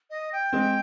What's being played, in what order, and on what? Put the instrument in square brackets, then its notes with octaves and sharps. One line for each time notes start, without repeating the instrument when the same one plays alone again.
[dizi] D#5
G5
[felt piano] G#3 C4